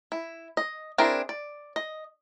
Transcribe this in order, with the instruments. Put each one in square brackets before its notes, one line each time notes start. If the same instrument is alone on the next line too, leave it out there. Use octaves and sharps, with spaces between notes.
[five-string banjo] E4
D#5
C4 D4 E4 G#4 A#4
D5
D#5